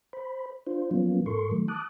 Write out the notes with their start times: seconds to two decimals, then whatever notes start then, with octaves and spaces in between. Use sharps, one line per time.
0.13 C5 B5
0.67 D4 F4 C5
0.91 F3 F#3 A#3 B3 C#4 F4
1.26 G#2 A4 A#4 C6 C#6
1.51 D#3 F#3 A3
1.68 A5 D6 D#6 F#6